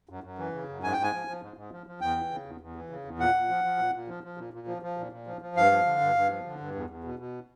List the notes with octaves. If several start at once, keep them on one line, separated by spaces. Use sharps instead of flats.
F#2
F#2
E3
C#3
F#2
G#2 G#5
G5
G#2
G#5
F3
F3
G#2
G#2
F3
F3
E2 G5
E3
C#3
E2
E2
E3
C#3
E2
A#2 F#5
A#2
F3
F3
A#2
A#2
F3
F3
A#2
A#2
F3
F3
A#2
A#2
F3
F3
G2 F5
F3
D3
G2
G2
F3
D3
G2
E2
E2
B2
B2